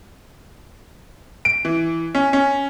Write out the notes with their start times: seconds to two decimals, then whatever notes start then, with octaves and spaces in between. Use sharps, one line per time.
1.45 D7
1.65 E3
2.15 C#4
2.33 C#4